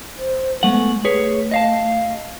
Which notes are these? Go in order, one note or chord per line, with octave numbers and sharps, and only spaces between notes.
C5
G#3 A3 B3 F#5
A3 G#4 B4 C#5
D#5 F5 A5